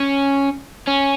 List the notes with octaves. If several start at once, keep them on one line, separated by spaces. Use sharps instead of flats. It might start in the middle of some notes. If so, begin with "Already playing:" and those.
Already playing: C#4
C#4